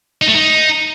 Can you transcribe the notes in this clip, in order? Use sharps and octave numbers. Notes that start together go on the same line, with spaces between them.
D#4
A3
D#4